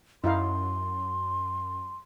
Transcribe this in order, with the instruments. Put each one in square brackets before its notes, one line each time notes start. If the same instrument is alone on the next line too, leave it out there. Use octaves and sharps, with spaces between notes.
[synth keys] F#2 [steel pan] D#4 E4 F5 [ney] C6